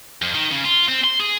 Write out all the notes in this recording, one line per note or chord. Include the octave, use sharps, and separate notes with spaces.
F2
D#3
C#3
F4
C4
C6
G#4